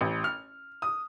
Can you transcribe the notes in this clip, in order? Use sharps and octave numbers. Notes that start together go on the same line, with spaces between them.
A1
F6
D#6